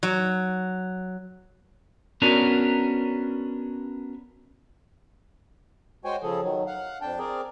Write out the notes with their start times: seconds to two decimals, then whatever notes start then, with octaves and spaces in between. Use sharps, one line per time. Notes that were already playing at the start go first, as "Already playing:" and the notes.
0.03 F#3
2.22 B3 C#4 D4 F#4 A#4
6.05 G#3 F#4 C5 C#5 G5 G#5
6.23 C#3 F3 G#4 A4
6.42 D#3 F#3
6.67 F5 F#5
7.02 F2 D4 G5 A5
7.19 C4 G#4 A#4 D5